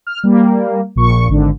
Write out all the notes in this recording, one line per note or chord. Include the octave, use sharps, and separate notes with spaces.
F6
G3 A#3
A#1 A#2 C#6
G#1 D3